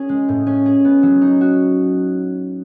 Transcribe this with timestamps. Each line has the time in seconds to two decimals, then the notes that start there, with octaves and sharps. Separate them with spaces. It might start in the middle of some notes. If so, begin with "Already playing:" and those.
Already playing: C#4 G#4
0.09 G#3
0.29 A2
0.47 C#4
0.66 G#4
0.85 B3
1.03 F#3
1.22 D#4
1.41 F#4